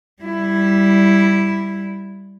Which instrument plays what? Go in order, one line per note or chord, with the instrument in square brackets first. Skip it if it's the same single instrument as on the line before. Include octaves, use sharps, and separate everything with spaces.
[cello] G3 E4